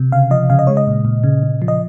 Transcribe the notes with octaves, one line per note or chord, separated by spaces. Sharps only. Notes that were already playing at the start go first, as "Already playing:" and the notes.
Already playing: C3
C#3 F5
F3 D#5
C#3 F5
D#5
G#3 C#5
D#5
A#2
A#2
C#3
C#3
F3
D#5